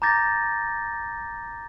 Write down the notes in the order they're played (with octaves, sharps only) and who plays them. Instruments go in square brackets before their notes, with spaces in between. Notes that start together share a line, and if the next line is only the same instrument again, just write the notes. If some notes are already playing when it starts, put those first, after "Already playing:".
[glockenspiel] A#5 D6 G6 A6 A#6